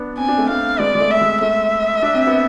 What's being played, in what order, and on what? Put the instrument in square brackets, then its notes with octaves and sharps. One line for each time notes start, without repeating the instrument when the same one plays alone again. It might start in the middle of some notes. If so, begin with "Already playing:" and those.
Already playing: [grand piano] B3 D4
[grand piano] C4 [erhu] G#5
[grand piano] D4
A3 C4
[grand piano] A3 C4 [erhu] F5
[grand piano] G#3 B3 [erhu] D5
[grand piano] G#3
A3
[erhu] E5
[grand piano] G#3
[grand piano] A3 [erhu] E5
[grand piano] D4
C4
B3